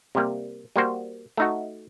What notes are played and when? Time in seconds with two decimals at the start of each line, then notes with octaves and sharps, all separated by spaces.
0.15 C3 G3 A#3
0.76 G3 A#3 F#4 C5
1.37 A3 D#4 F#4